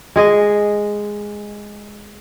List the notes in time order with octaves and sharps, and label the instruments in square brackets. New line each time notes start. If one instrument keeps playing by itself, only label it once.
[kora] G#3 G#4 D#5